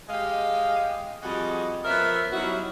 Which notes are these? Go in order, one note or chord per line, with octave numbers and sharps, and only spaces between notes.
G#3 G4 D#5 F5
F2 G3 F#4 G#4 D#5
F3 B3 C#4 A#4 E5
F#3 G3 C#4 D#4 E4 F#4